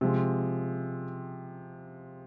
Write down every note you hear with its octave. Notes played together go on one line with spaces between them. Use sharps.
C3 F3 G#3